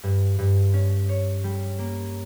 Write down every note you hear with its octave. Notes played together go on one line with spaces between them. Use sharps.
G2
G2
C#4
C#5
G3
A#3